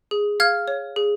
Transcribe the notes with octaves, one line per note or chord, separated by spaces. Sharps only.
G#4
F5 F6 G#6
C#5
G#4